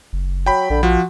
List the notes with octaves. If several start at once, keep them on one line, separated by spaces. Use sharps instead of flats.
F#1
F#3 G5 B5
A#1 D3
F3 F#4